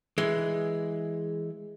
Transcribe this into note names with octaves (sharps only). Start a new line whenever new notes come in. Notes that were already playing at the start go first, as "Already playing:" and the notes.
E3 G#3